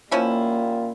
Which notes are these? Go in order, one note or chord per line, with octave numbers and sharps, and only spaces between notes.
A#2 F3 G3 A#3 C#4 E4 F4